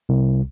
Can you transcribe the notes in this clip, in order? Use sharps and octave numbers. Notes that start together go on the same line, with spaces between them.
C2